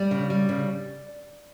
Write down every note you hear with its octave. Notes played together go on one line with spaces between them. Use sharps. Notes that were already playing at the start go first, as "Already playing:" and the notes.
Already playing: G3 D5
C#3
G3
C#3